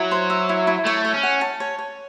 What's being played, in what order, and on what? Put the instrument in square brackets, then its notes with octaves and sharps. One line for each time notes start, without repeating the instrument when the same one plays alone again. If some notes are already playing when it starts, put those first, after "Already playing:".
Already playing: [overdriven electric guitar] F#3 [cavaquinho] E4
[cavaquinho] C5
E5
E4
E4
[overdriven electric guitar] A3 [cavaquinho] C#5
[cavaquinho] C#5
[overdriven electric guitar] C#4
[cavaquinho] F#5
A5
C#5
C#5